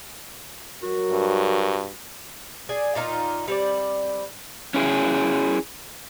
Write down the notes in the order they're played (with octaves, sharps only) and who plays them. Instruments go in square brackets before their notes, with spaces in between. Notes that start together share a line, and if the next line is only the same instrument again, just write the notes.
[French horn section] F#3 A#4 [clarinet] F#4
[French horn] G2
[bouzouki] G#4 D5 G#5
A#2 D#4 F4 A#5
G3 C4 D5
[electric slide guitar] C#4 E4 G#4